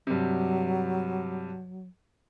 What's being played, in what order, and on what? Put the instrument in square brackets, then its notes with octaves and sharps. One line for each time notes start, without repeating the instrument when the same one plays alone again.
[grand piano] G2 C3 [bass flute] F#3